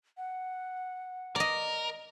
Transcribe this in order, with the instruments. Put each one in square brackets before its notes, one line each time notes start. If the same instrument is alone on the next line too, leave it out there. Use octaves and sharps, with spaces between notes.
[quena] F#5
[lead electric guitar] A#4 [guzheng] D5 D#5